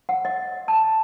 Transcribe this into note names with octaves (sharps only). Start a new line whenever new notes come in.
F#5
D#5
A5